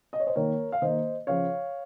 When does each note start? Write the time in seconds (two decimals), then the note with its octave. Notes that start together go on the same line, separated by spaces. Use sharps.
0.13 D#5
0.20 C#5
0.27 C5 D#5
0.36 D#3 A#3 A#4 C#5
0.72 F5
0.82 D#3 A#3 C5 D#5
1.27 C#3 F3 C#5 F5